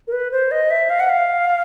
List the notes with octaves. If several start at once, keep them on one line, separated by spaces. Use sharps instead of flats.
A#4
B4
C5
D#5
E5
F5
F#5
F5